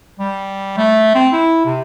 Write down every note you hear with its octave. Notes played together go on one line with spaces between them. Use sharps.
G3
A3
C4
E4
C3